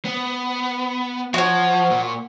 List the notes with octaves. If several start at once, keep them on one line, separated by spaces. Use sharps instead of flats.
B3
F3 F#4 C#5
A#2